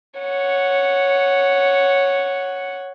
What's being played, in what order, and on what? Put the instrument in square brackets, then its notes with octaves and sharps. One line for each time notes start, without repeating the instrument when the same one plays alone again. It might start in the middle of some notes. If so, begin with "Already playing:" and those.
[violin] C#5 F#5